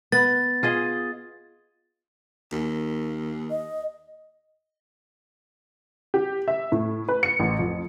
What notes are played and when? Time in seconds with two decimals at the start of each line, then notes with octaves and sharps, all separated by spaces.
0.12 B3 A6
0.63 F4 G#4 D#5
2.52 D#2
3.51 D#5
6.14 G4
6.48 E5
6.72 A2
7.09 B4
7.23 C#7
7.40 A1
7.59 F2